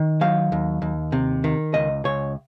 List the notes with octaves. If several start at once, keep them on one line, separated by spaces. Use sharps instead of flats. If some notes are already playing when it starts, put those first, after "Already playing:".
Already playing: D#3
F#3 F5
D#2
D#2
C3
D#3
C#2 D#5
C#2 C#5